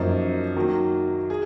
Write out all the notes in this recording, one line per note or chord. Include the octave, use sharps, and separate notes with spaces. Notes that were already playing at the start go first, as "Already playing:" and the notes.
Already playing: F#2 F3 A#3 D#4
D#3 F#3 A#3
G#4